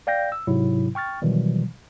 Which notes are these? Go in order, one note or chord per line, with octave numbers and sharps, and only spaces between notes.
D5 F5 G5 G6 A#6
E6
G#2 C3 F#3 E4
G5 C#6 F6 A6
B2 D#3 E3 F#3 G3